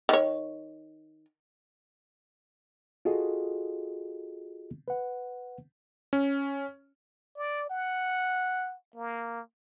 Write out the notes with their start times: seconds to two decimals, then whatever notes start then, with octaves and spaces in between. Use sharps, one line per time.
0.09 D#3 C#5
3.05 F4 F#4 G#4 A4 D#5
4.88 B4 F#5
6.13 C#4
7.36 D5
7.70 F#5
8.96 A#3